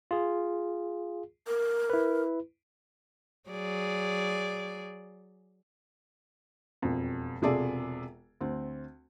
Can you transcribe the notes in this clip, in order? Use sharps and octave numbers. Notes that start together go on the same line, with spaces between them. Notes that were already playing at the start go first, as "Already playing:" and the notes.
F4 G#4
A#4
E4 B4
F#3 G#4 D5
E1 F2
E1 C3 F4 G#4 A4 D5
D2 C4